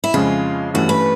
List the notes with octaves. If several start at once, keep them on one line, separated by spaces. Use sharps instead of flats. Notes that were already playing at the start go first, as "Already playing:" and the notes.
E4
F2 C#3 F3 G#3 C#4 F4
G2 E3 A3 C#4 F#4
B4